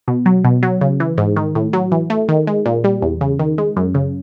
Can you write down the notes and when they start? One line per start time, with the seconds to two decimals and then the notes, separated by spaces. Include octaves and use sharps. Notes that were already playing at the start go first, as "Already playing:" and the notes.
0.08 B2
0.26 F#3
0.44 B2
0.63 F#3
0.81 C#3
1.00 E3
1.18 G#2
1.36 D#3
1.55 A2
1.73 F#3
1.92 E3
2.10 A3
2.29 D#3
2.47 G#3
2.66 A#2
2.84 G3
3.02 E2
3.21 C#3
3.39 D#3
3.58 G#3
3.77 F#2
3.95 C#3